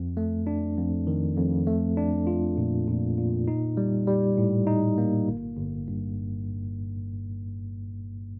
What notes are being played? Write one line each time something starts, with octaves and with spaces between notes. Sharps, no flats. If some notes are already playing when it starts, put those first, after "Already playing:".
Already playing: F2
A3
D4
F2
D#3
F2
A3
D4
F4
A#2
A#2
A#2
D#4
G3
G3
A2
D#4
A#3
G1
G1
G2